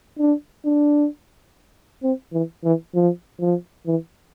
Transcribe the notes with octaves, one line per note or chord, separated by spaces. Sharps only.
D4
D4
C4
E3
E3
F3
F3
E3